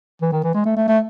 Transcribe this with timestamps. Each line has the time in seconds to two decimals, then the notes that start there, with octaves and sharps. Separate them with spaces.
0.22 E3
0.32 D#3
0.44 E3
0.54 G#3
0.65 A3
0.77 A3
0.88 A3